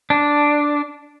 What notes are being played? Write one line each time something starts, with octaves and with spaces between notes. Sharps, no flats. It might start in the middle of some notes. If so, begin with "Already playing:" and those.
D4